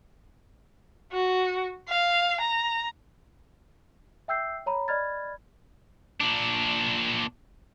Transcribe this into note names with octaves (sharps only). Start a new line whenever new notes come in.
F#4
F5
A#5
E5 G5 E6 G6 C7
C#5 A#5 B5
D5 D#5 B5 F6 G#6 A6
A#2 D4